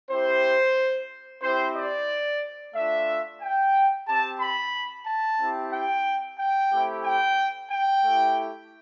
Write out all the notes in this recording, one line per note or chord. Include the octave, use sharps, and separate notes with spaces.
C4 E4 G4 C5
C4 E4 G4 C5
D5
A3 D4 F4 E5
G5
C4 G4 A5
B5
A5
C4 E4 G4
G5
G5
A3 C4 E4 G4
G5
G5
A3 E4 G4